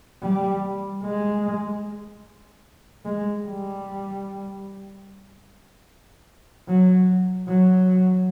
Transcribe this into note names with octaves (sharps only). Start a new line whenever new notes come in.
G3
G#3
G#3
G3
F#3
F#3